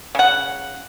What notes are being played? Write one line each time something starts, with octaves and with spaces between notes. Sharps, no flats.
C#3 F#5